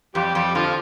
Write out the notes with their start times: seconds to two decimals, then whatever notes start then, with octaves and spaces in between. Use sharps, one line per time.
0.15 F2 G3 G4
0.35 F2 G3 G4
0.55 D3 F3 F4